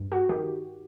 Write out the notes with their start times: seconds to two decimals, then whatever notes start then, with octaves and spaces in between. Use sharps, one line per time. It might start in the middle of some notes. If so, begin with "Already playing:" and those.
Already playing: G2
0.12 F#4
0.29 D#3 G4